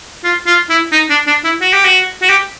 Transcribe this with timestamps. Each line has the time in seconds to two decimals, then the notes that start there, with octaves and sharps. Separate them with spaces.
0.24 F4
0.47 F4
0.70 E4
0.92 D#4
1.10 D4
1.27 D4
1.44 E4
1.61 F#4
1.73 G4
1.85 F#4
2.22 F#4
2.30 G4